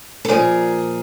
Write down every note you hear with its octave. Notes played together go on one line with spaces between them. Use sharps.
A4
A#2 F3 G#4 A#4